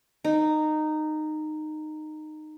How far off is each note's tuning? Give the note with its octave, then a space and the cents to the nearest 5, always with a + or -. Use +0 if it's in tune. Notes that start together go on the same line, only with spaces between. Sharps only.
D#4 -15